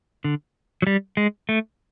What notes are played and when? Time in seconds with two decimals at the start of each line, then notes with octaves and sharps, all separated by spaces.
0.24 D3
0.82 F#3
0.87 G3
1.17 G#3
1.49 A3